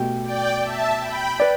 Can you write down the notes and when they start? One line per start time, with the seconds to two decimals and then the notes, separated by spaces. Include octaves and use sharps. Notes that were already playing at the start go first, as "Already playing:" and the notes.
Already playing: B2 A3 G4
0.23 D5 G5
0.61 E5 A5
1.01 G5 B5
1.40 B4 D5